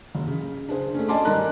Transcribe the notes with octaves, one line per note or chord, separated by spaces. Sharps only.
F#1
C#3
D4 G#4 C5
A3 C#4
D5 D#5 G#5 A5 C6 D6
G2 D#4 A#4 A#5 F#6